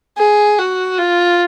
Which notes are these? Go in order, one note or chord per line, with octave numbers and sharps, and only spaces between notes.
G#4
F#4
F4